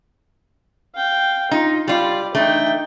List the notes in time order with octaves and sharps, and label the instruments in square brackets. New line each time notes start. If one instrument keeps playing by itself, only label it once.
[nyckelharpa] F5 G5
[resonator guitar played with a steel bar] D#4 [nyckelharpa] F4
[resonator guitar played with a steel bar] G3 F4 [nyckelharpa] D5 B5
[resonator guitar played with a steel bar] E3 A3 D4 [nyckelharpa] D#4 G5